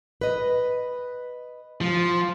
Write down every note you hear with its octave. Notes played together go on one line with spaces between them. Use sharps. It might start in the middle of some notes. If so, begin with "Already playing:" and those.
B4 D#5
F3